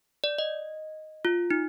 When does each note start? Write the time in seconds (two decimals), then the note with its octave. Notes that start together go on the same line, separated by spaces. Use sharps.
0.24 D5
0.38 D#5
1.25 F4
1.51 D#4